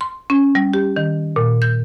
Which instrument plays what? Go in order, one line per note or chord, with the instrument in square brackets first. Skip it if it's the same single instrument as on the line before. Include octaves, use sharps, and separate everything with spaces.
[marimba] C6
C#4
G3
G4
D#3
A#2
G6